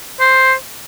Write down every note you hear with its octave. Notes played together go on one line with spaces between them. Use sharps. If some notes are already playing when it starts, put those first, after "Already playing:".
C5